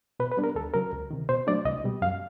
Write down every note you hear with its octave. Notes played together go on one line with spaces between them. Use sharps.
B2 B4
B4
G3 B3 D4
A#4
D2 A4
C#3 F#3 A#4
C#2
C3 D#3
B2 C5
F#3 A3 D4 D5
C2 D#5
B2 G3
F#2 F5